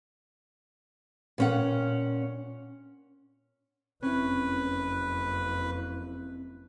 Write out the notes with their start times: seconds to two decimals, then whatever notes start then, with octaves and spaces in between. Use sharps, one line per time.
1.38 A#2 C#4 F#5
4.03 F#1 F2 C4 C#4 E4 B4